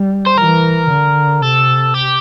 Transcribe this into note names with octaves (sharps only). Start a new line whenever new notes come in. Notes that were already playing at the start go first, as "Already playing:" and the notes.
Already playing: G3
C5
E3 A#4
D3
C3 A4
G4